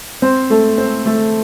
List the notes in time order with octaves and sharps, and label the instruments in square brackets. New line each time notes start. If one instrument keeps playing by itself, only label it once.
[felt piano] C4 C5
A3 A4
C4 C5
A3 A4